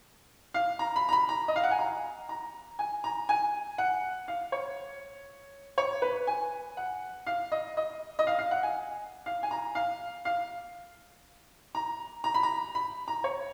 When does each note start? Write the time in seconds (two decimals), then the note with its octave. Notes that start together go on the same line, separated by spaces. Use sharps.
0.54 F5
0.79 A#5
0.96 B5
1.09 A#5
1.12 B5
1.29 A#5
1.48 D#5
1.56 F5
1.63 F#5
1.71 G#5
1.79 A#5
2.29 A#5
2.79 G#5
3.04 A#5
3.29 G#5
3.78 F#5
4.28 F5
4.52 C#5
5.78 C#5
6.02 B4
6.27 G#5
6.77 F#5
7.27 F5
7.52 D#5
7.77 D#5
8.19 D#5
8.27 F5
8.39 F5
8.51 F#5
8.63 G#5
9.26 F5
9.43 G#5
9.51 A#5
9.75 F5
10.25 F5
11.75 A#5
12.24 A#5
12.34 B5
12.43 A#5
12.75 B5
13.08 A#5
13.24 C#5